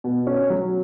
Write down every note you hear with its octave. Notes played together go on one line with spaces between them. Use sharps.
B2
C#4
F#3